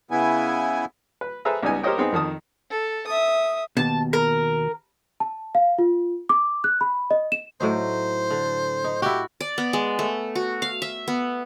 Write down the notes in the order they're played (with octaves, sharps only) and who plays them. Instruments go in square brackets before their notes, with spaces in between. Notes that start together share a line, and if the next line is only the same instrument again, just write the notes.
[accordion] C#3 B3 E4 G#5
[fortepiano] B4
G#4 A4 B4 C5 E5 A#5
C#2 G3 B3 D#4 G#5
G4 A#4 C5 C#5 D#5 G5
B3 C4 D#4 G#4
F2 D#3 A5 D#6
[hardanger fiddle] A4
E5 D#6
[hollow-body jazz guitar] D#2 B2 [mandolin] A5
[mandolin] A#4
[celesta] A5
F5
F4
D6
F#6
B5
D#5
E7
[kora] A2 F#3 D#4 [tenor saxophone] C5
[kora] D3
D#4
[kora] E4 F#4 [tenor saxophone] G4
[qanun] D5
B3
G#3
A3
F#4
F5
E5
B3